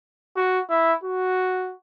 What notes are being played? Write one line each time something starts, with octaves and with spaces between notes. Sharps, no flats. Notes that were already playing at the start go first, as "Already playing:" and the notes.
F#4
E4
F#4